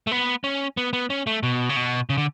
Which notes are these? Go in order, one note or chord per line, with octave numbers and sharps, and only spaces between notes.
A3
B3
C#4
B3
B3
C#4
A3
B2
C#3
B2
C#3
D3